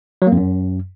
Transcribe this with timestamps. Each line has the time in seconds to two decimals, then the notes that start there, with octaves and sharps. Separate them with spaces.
0.22 F#3
0.27 A#3
0.32 F2
0.37 F#2